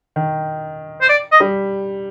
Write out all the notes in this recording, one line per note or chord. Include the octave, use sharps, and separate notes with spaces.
D#3
C5
D5
D#5
G3